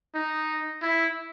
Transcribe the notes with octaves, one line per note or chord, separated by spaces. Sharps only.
D#4
E4